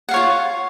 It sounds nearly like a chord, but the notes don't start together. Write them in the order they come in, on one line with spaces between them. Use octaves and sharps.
F#5 F5 C#5 F4